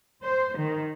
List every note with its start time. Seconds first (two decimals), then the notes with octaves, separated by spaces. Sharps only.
0.22 C5
0.58 D#3